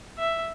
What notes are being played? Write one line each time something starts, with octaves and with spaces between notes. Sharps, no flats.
E5